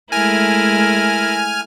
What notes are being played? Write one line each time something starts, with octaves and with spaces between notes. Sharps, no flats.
G#3 A3 E4 A#4 G#5 F6